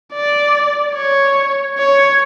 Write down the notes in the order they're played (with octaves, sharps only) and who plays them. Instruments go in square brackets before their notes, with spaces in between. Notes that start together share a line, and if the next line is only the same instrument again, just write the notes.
[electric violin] D5
C#5
C#5